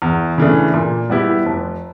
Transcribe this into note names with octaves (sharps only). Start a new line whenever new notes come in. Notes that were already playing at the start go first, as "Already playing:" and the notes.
E2
C#3 E3 A3 D4
A#2
G3 B3 E4 G4
F1